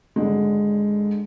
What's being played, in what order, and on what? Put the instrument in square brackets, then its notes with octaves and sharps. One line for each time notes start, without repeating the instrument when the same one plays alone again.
[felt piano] G#1 D3 G#3